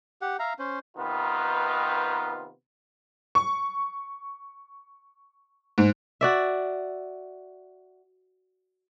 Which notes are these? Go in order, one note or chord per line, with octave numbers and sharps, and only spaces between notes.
G4 F#5
E5 F5 A#5
C#4 C5
C3 D#3 B3 D#4 F4 B4
C#6
G#2
F#4 D5 E5